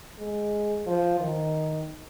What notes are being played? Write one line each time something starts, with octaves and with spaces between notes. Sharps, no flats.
G#3
F3
D#3